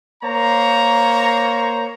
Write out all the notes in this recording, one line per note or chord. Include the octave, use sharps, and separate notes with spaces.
A#3 C5 C#5 A#5